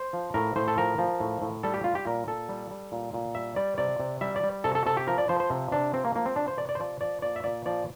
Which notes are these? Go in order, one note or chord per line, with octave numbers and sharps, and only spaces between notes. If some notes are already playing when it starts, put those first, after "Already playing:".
Already playing: C5
F3
A2 A#4
A2 C5
A4
F3 A#4
F3
A2
A2
G3 A4
G4
G3 F4
G4
A#2 A#4
A#2 A4
G3
G3
A#2
A#2
G3 E5
G3 D5
C3 D5
C3
G3 E5
D5
G3
C3 A4
A4
C3 A4
G4
F3 A#4
D5
F3 C5
C5
C3
C3 D4
F3 C4
A#3
F3 A#3
C4
C3 D4
C5
C3 D5
D5
C5
F3 D5
F3 D5
A#2 D5
E5
A#2 D5
F3 D5